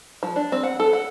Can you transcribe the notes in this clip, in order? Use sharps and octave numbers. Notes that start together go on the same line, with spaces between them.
F3
D4
C4
F#5
A4
F#5